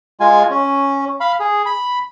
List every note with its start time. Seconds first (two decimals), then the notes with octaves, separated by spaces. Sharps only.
0.20 G#3 F4 G#5
0.50 C#4
1.20 F5 B5
1.40 G#4
1.66 B5